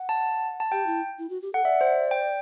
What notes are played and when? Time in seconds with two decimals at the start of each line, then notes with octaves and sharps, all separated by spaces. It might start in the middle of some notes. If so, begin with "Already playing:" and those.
Already playing: F#5
0.09 A5
0.60 A5
0.72 G4 G5
0.86 E4
1.19 E4
1.30 F#4
1.42 G4
1.53 A4 F#5
1.64 D5 E5
1.81 C5
2.11 G5